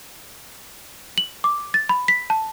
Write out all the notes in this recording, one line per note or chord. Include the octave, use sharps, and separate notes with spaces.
F#7
D6
A6
B5
B6
A5